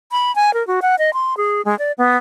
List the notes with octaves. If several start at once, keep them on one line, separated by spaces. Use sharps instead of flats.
B5
G#5
A#4
F#4
F#5
D#5
C6
G#4
G#3
D5
B3